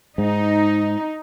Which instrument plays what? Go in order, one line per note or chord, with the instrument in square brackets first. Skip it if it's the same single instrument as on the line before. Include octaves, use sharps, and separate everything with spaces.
[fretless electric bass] G#2 [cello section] D#4